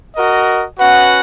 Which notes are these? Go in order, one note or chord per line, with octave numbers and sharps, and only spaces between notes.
F#4 A#4 D#5
C#4 F#4 B4 F#5